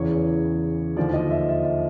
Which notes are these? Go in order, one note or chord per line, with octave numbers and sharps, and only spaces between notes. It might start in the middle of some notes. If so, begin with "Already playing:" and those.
Already playing: E2 C#3 E3 C#5
D#2 D3 F3 D5
D#5
E5
E5
D#5